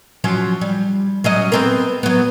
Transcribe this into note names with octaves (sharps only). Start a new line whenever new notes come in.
F3 F#3 C#4
G3
F#3 C#4 D#5
B3 C4 A#4
F#3 B3